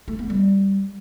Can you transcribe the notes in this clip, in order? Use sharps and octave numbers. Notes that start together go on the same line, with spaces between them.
A3
B3
G3